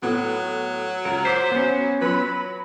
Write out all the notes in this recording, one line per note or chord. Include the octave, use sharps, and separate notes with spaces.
A2 F#3 B3
C#2 A#4
C5 D6 B6 C7
B3 C#4
F#3 B4 B5